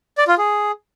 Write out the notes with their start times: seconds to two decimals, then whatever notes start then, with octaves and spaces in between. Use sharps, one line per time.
0.18 D5
0.28 F4
0.38 G#4